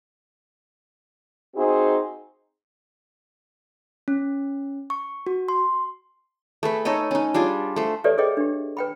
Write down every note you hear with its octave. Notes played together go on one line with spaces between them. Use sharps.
C4 D#4 F#4 G#4 C5
C#4
C#6
F#4
C6
A3 G#4 B4
D#4 A4 C#5 D#5
C#4 D#4
G3 D4 F4 G#4
A3 C5
G4 A4 B4 C#5 D5 E5
G#4 A4 B4 C#5 D#5 G5
D4 G4
B4 G5 B5